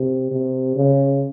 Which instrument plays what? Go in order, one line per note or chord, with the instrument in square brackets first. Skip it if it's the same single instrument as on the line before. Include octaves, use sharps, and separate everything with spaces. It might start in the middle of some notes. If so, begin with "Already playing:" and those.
Already playing: [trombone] C3
C3
C#3